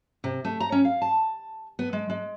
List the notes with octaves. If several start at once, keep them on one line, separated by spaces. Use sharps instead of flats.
C3
A3
A#5
C#4
F5
A5
B3
G#3
G#3